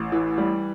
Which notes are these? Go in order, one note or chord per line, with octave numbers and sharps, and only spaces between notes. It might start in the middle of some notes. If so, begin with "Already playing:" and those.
Already playing: A1
E3
G3